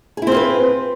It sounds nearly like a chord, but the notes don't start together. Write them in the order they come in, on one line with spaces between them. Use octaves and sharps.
G#4 E4 C4 F4 B4